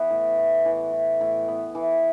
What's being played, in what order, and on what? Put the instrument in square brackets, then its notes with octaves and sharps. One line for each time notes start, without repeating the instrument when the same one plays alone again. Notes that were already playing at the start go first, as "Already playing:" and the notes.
Already playing: [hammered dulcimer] E3 B3
A2
A2
E3
E4
A2
B3
E3